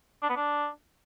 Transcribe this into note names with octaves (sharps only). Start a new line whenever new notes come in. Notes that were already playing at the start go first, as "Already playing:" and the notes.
D4
B3
D4